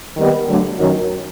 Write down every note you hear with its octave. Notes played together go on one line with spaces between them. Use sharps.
D#3 G3 B3
D3 F#3 A3
F#2 D#3 F#3